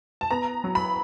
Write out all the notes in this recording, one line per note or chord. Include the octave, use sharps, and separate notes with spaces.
A5
B3 A#5
F#3
B5